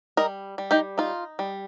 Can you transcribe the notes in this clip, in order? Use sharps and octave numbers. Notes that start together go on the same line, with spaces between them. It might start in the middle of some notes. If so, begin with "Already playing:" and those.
G3 A#4 D#5
G3
D#4 G4
D#4 F4
G3